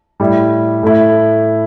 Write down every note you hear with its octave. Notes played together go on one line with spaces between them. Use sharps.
A2 G3 E4
A2 A3 E4